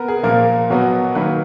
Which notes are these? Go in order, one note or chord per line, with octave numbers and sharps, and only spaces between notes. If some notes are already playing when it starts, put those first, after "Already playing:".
Already playing: B3 A#4
G#4
A#2 F3 A#3 A#4
B2 F#3 B3
D#3 F#3 A#3 B4